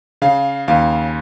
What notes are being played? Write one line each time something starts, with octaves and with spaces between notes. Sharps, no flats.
C#3 F5
D#2 F5